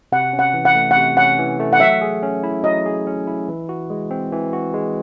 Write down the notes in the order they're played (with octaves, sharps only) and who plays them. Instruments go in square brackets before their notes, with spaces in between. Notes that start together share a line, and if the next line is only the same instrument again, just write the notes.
[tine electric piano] C3 [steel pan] F#5
[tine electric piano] C#4
[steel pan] F#5
[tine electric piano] E3
[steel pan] F#5
[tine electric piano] A3
[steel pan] F#5
[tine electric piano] C3
[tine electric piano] C#4 [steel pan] F#5
[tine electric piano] E3
A3
[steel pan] F#5
[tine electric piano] F#3 [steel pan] E5
[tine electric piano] G#4
C#4
E4
[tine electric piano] F#3 [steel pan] D#5
[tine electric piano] G#4
C#4
E4
E3
F#4
G#3
C4
E3
F#4
G#3